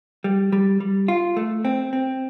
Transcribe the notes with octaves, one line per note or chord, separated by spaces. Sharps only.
G3
G3
G3
F4
A3
C4
C4